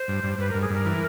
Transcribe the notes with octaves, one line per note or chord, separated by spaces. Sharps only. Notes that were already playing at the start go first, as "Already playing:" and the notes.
Already playing: C5
G2
G2
G2 B4
G2 A#4
G#4
G2 A#4
E3